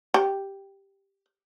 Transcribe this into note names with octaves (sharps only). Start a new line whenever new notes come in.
G4